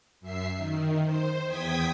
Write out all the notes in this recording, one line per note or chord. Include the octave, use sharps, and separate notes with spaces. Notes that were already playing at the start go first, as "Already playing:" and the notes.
F#2 E5 C7
D#3
C5
E2 G5 D#6 G#6 B6